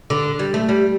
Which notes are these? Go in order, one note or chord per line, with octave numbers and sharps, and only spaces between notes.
D3
G3
A3
G3